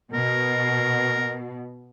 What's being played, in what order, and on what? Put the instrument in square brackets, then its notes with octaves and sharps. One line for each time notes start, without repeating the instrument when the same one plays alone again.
[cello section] B2 [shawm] A#4